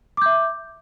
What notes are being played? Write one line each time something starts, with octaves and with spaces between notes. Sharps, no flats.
E5 D6 G6